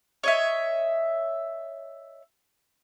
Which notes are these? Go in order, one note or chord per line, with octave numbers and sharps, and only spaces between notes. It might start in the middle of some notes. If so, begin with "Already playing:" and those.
C#5 D#5 E5